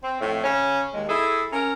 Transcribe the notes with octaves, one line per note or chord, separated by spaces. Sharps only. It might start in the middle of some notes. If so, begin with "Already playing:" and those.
C4
F2 A2
C#3 C#4
D#2 G#3
E4 G#4 A4
C#4 A#4